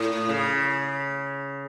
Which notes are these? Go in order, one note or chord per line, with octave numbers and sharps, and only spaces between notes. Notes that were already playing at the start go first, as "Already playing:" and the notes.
Already playing: A2
C#3